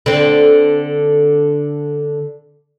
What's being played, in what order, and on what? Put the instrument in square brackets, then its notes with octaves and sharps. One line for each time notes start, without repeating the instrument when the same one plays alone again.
[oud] D3 C4